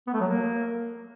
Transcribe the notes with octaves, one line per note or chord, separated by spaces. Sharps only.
B3
A3
F#3
A#3